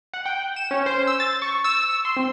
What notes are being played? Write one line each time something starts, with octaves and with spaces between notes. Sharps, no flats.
F#5
G5
E7
C#4
C5
E6
A6
C#6
E6
C6
C4